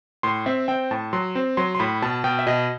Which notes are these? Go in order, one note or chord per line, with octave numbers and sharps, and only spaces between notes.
A2 C6
C4 E5
C4 G5
A2 A5
F#3 C6
C4
F#3 C6
C6
A2 B5
B2 A5
B2 G5
E5
B2 D#5